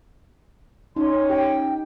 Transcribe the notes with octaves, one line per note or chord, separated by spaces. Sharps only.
C#4 D#4 C6
G4 G5